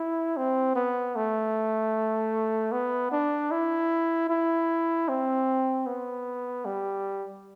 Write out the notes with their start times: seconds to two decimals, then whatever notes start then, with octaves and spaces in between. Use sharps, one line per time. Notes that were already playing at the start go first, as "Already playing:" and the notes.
Already playing: E4
0.37 C4
0.76 B3
1.16 A3
2.72 B3
3.12 D4
3.51 E4
4.30 E4
5.09 C4
5.87 B3
6.66 G3